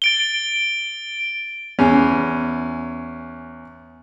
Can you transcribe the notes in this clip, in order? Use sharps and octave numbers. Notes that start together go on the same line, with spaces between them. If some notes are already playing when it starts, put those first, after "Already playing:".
A6 D7 G7
E2 C#4